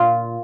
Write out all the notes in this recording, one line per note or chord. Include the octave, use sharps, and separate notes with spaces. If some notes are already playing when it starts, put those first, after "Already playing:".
Already playing: A#2 F4